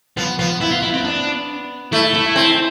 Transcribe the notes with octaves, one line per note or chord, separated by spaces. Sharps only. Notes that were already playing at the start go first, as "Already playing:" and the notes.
F3 B3
F3 B3
B3 E4
F4
E4
C4
D4
A3 E4
E4
C4